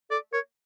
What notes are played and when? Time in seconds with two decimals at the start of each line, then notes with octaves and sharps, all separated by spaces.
0.10 A4 D5
0.32 A#4 C#5